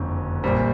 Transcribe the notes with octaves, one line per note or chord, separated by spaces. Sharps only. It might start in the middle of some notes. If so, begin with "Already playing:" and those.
Already playing: F#1 F2 D3
A#1 A#2 G3 C4